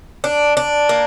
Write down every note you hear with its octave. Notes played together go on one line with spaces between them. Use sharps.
D4
D4
A#3